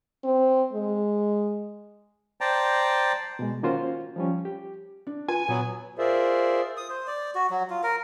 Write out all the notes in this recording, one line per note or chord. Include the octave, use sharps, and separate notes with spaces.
C4
G#3
C5 D5 G5 A5 A#5
B2 G#3
D#3 A#3 C#4 F4 F#4 C5
F3 G3 C#4
G4
D4
F4 B4 G#5
A#2 F#3 B3
F4 G#4 A#4 C5 D5 E5
D#6
C5
D5
F#4
F#3
F4
A#4